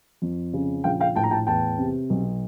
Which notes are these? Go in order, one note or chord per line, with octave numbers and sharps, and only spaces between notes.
F2
C#3
A#1 F5 G5
F5 G5
A2 G5 A5
A#5
G5 A5
E2 G5 A5
C3
B1